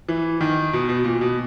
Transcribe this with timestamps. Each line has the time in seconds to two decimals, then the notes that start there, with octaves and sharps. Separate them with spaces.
0.09 E3
0.41 D#3
0.73 B2
0.89 B2
1.04 A#2
1.21 B2